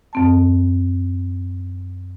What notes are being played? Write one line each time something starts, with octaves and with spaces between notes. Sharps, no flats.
F#2 C4 A5